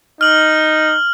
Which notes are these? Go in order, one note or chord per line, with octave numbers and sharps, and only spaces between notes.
D#4 F6 F#7